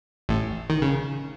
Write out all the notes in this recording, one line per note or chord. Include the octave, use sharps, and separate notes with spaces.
A1 A2
D#3
C#3